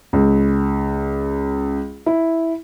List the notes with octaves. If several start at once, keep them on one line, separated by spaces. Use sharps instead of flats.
C#2
E4